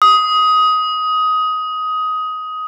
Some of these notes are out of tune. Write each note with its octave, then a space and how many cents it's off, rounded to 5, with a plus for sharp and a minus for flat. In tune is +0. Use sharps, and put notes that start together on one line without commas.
D#6 +15